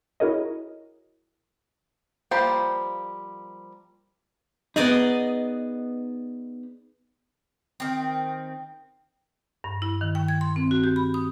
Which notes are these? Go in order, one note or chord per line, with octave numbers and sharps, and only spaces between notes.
E4 F#4 G#4 A#4 C#5 D#5
F3 G3 A#3 G4 C5
B3 D#4 G#4 D5 D#5
D#3 C4
G2
E4
D#3
G5
G#6
C6
C4
F#4
G4
B5
D#6